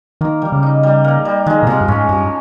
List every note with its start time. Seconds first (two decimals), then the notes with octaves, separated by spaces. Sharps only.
0.21 D#3 A#3
0.42 G3
0.52 C#3
0.63 D#4
0.83 G3
1.04 A#3
1.25 G3
1.46 D#3 G#3
1.63 A#2
1.67 C3 F3
1.81 G2
1.88 G#2 C#4
2.09 G2 F3